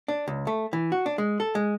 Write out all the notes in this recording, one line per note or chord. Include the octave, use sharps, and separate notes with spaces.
D4
C#2
A3
E3
F#4
D4
G#3
A4
G#3